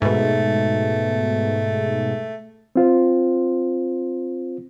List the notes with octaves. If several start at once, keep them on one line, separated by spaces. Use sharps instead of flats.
G#2 B2 A3
C4 F4 C5